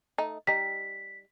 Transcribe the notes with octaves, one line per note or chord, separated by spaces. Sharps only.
A3 D#4
G3 D#4 B6